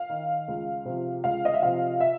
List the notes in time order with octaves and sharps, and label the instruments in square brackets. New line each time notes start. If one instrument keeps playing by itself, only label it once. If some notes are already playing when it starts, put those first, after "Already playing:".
Already playing: [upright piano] F5
D#3
C#2
C3 F3
C#2 F5
D#5
E5
C3 F3 F5
E5